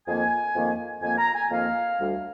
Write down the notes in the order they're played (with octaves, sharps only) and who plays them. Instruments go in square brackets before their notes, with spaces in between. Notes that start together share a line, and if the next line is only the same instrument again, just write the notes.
[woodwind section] F2 D#3 A#3 G#5
F2 D#3 A#3
F2 D#3 A#3 G#5
A#5
G#5
F2 D#3 A#3 F5
D2 D3 G3